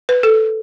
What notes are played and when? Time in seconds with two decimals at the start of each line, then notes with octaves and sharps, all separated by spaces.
0.09 B4
0.23 A4